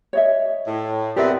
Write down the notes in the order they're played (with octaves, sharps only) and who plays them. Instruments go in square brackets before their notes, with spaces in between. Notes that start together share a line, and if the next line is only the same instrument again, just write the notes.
[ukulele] C#5 D#5 E5
[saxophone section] A2
[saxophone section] B3 C4 [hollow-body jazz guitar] G4 A#4 E5 [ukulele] D5